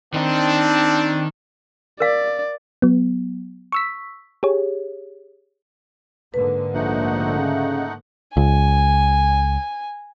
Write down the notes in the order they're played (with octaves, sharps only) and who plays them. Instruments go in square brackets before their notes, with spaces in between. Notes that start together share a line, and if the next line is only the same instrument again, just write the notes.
[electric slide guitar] D#3 D#4 [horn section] C4 D4
[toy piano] A#4 F5 [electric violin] D5
[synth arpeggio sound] F#3 B3
C#6 E6 B6
G4 G#4 C#5
[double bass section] G#2 D3 A#3 [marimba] B4
[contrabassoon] A#1 [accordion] A3 D#4 F#5
[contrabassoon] C#3
[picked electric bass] C#2 [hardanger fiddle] G#5